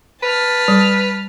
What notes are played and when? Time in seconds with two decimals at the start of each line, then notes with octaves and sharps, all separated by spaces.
0.23 B4 A5 F6
0.68 G3